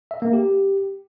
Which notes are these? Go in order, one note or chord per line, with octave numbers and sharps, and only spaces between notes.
E5
A#3
G4